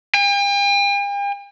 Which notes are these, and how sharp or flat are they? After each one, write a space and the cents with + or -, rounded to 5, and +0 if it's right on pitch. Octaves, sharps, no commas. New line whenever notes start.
G5 +45